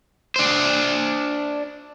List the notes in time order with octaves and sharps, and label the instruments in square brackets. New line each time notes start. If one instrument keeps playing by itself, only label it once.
[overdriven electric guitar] D4 C5